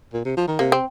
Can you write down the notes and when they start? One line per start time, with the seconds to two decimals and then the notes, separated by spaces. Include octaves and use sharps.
0.13 A#2
0.25 C3
0.37 F3
0.48 D#3
0.59 C3 A#3
0.72 C4